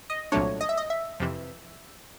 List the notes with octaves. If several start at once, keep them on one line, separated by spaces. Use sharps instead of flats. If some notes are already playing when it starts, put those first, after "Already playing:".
D#5
C2 A#2 F#3 A3 D4 C#5
D#5
E5
D#5
E5
F2 C3 E3